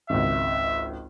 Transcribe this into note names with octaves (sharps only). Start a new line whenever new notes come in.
G#1 C#2 E5